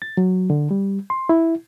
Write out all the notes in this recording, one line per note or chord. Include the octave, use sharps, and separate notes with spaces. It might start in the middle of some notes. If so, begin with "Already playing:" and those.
A6
F#3
D3
G3
C6
E4